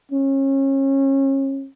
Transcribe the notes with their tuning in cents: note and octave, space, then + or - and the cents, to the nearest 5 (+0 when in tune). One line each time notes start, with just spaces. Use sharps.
C#4 -30